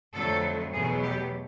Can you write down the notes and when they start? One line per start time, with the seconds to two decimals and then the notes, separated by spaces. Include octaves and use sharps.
0.14 F2 D3 F#3 A3 A4
0.73 E2 B2 F#3 A3 G#4
1.02 G4